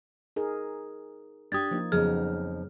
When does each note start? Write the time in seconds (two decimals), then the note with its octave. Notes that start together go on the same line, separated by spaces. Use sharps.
0.36 D#4 G#4 A#4
1.52 D4 G4 D#6 G#6 A6
1.71 F3 A#3 D#4
1.92 F2 C#3 F#3 B3 D#4 G#4 F6